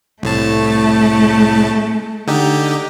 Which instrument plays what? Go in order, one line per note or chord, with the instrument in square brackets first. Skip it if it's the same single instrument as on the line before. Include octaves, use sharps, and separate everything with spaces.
[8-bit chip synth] C2 A2 A5 [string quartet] A3
[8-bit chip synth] D3 D#4 G4